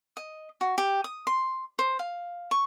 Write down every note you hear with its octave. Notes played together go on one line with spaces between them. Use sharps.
D#5
F#4
G4
D#6
C6
C5
F5
C#6